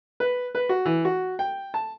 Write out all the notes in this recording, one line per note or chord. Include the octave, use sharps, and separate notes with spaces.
B4
B4
F#4
E3
F#4
G5
A5